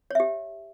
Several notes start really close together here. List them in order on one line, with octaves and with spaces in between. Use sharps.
C#5 E5 G4